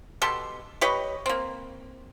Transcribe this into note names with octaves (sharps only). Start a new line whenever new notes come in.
B2 G4 A4 C6
G4 B4 C#5 D#5
A#3 C4